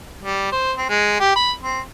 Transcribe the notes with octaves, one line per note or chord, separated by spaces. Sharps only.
G3
C5
C4
G#3
G4
B5
C4